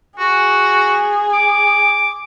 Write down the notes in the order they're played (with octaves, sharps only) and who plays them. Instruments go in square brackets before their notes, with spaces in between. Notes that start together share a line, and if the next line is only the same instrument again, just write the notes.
[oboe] F#4 [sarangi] G#4
[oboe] D6